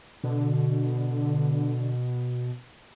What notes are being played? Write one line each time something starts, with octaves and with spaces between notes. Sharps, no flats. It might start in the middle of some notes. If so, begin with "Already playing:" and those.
B2 D3